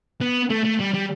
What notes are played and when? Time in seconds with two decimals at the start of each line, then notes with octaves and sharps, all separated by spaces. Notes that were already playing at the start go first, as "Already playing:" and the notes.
0.21 B3
0.51 A3
0.65 A3
0.80 G3
0.94 G3